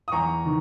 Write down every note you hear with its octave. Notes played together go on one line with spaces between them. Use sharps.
D#6
E2 A#5 C#6
D#3